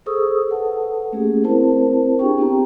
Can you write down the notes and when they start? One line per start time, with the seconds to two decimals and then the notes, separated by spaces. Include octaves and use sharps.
0.06 G#4 A4 C5 C#6 D#6 E6
0.49 A4 B4 F#5 A5
1.12 A3 A#3 C#4 G4 G#4
1.44 C4 E4 A#4 C5 A5
2.19 D4 F4 G4 G#4 G5 C#6
2.38 B3 C4 G4 A#5